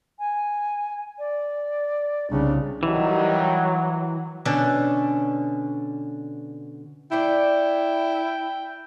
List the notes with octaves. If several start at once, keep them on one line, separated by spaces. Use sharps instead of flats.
G#5
D5
C2 C#3 D4
D#3 E3 F#3 G3 D#4
B2 D3 C#4 D4
A3 D4 E4 D5 G5